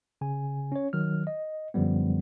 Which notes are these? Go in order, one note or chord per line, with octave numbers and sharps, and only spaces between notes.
C#3 G#5
C#4 C#5
D#3 F#3 F6
D#5
F#2 D3 F3 G3 B3